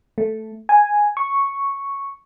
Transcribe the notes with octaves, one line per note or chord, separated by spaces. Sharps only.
A3
G#5
C#6